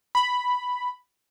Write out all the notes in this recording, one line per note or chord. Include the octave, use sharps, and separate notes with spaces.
B5